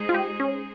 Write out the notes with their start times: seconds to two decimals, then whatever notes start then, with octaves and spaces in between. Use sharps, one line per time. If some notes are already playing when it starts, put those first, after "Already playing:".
Already playing: G#3 D#4 G#4 C5
0.09 F4
0.14 G4
0.40 C#4